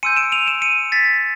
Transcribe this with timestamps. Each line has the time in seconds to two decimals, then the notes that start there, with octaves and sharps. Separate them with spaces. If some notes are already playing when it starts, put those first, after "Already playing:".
0.03 G#5 C6 E6 G6 C#7 D#7
0.17 D7 E7
0.32 D#7 F7
0.47 D7 E7
0.62 C#7 D#7
0.92 A6 B6